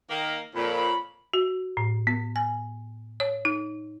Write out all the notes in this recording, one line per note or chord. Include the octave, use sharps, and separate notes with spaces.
D#3 A#3
F2 A#2 A#4 C#5 B5
F#4
A2
B3
G#5
C#5
D#4